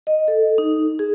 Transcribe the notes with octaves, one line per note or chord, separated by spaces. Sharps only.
D#5
A4
D#4
G#4